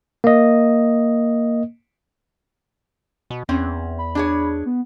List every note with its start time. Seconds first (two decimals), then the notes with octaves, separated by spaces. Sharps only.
0.24 A#3 D#5
3.30 B2
3.49 E2 C4 C#4
3.98 B5
4.15 D4 G#4 C#5
4.66 B3